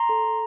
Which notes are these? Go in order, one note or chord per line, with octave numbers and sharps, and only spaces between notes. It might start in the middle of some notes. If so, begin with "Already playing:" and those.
Already playing: A#5 C6
A4
A4